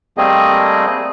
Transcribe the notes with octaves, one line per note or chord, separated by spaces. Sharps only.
G3 A3 A#3 C4 G#4 D#5